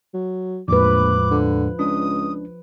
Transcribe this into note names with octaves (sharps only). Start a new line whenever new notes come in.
F#3
A#1 E2 A2 F3 G#3 B4 D6
D3
C#2 D4 D#6